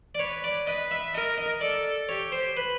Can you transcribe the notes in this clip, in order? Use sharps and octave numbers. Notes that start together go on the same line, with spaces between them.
D5
B4 C#5
D5
B4 D#5
E5
A#4 D#5
D#5
A4 D5
G4 C#5
C5
B4